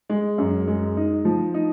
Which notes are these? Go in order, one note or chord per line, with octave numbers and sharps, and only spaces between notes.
G#3
F#2
G#3
D#4
F3
D#4